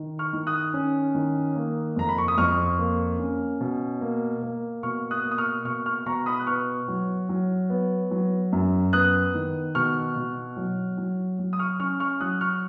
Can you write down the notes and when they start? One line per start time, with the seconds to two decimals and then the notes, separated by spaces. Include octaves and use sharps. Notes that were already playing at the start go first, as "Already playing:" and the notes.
Already playing: D#3
0.19 C#6 F6
0.33 D#3
0.47 D#6 F#6
0.74 C#4
1.15 D#3
1.55 A#3
1.96 F2 A#5
2.09 B5
2.18 C#6
2.28 D#6
2.38 F2 C#6 F6
2.78 A#3
3.19 C#4
3.60 B2
4.01 A#3
4.42 A#3
4.83 B2 C#6 F6
5.11 D#6 F#6
5.24 A#3
5.31 D#6
5.38 C#6 F6
5.65 B2 C#6 F6
5.86 C#6 F6
6.06 B2 A#5 C#6
6.26 B5 D#6
6.40 F#6
6.47 B3 C#6 F6
6.88 F#3
7.29 F#3
7.70 B3
8.11 F#3
8.52 F#2
8.93 B3 D#6 F#6
9.34 D#3
9.75 B2 C#6 F6
10.16 B2
10.57 F#3
10.98 F#3
11.39 F#3
11.53 D#6
11.59 C#6 F6
11.80 C#4 C#6 F6
12.00 C#6 F6
12.20 F#3 D#6 F#6
12.41 C#6 F6